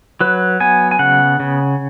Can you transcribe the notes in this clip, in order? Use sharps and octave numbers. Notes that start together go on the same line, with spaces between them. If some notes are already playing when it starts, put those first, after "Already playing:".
F#3 B4
B3 G#5
G#5
C#3 F#5
C#3